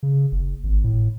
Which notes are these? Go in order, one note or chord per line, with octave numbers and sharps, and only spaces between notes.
C#3
F#1
G#1
A2